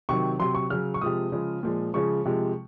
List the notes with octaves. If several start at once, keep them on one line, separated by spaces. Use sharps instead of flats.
C3 D#3 F#3 C#6
C3 F#3 C6
C#6
C#3 F#3 F6
C#6
C3 F3 G#3 D#6
C#3 F3 G#3
A#2 F3 G#3
C#3 F3 G#3 C#6
C3 F3 G#3